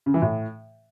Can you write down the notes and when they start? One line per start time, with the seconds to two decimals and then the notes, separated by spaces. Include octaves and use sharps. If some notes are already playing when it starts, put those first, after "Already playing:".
0.06 C#3
0.14 E3
0.22 A2